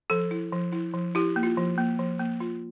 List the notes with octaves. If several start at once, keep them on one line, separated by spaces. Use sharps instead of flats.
F3 A4
E4
F3
E4
F3
E4 G4
A#3
F4
F3
A#3
F3
A#3
F4